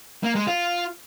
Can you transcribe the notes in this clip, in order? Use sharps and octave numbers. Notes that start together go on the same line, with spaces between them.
A#3
G#3
F4